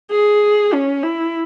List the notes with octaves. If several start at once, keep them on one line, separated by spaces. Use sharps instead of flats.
G#4
C#4
E4